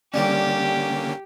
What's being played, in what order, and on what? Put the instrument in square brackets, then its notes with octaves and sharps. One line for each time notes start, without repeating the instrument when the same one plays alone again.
[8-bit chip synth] D3 A#3 C#4 [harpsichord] G3 [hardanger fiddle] G4